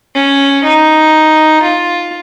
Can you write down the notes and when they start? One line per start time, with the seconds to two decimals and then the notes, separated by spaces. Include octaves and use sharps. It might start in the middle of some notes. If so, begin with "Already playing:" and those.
0.15 C#4
0.64 D#4
1.62 F4